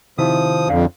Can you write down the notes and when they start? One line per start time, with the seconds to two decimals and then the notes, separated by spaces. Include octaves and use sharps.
0.18 C3 D#3 F3 E4 D#6
0.69 F2 D3 D5 F5